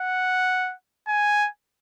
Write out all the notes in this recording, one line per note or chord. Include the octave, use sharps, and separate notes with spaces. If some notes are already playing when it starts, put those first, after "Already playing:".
Already playing: F#5
G#5